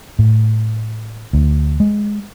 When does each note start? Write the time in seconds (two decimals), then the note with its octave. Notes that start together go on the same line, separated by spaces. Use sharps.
0.19 A2
1.33 D2
1.80 G#3